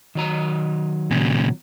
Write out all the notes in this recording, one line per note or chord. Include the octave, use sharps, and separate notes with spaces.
D#3 F#3 A#5
A#2 C#3